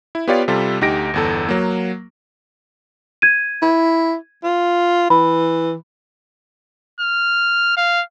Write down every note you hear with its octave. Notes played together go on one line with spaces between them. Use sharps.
E4
B3 F4 G4 C#5 D5 F5
C3 G3 F4 A4
D2 D#4 G4 A#6 D7
G1 E2 A4
F#3 A#3
G#6 D#7
E4
F4
E3 B5
F6
F5